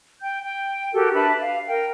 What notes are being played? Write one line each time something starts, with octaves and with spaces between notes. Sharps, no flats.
G5 G6
G5
F#4 G4 A4 A#4
D4 B4 E5 A5
F5
A#4 G5